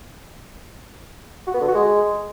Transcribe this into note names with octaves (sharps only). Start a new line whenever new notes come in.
F#4
B3
D3
F#4
G#3